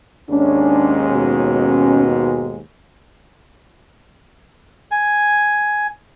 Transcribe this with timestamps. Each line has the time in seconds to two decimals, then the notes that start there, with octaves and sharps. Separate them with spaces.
0.30 D#2 G#2 G#3 C#4 D4
1.10 B2
4.91 G#5